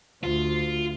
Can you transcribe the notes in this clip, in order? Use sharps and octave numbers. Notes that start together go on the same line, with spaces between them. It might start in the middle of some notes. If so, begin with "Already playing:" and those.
D2 F4